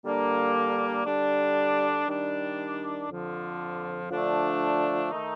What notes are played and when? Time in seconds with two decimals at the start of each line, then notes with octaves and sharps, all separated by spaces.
0.04 D3 G3 A#3 D4
1.05 D3 G3 D4
2.07 D#3 G3 D4
3.08 F2 D3 F3
4.10 D3 F3 A3 D4
5.11 D#3 A3 D#4